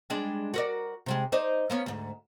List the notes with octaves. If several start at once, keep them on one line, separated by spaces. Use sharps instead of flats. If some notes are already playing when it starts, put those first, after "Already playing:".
G3 G#3 D4
F#4 A#4 D5
C3 G3 G#3
D#4 C5 D5
A#3 B3 C#4
D2 G#2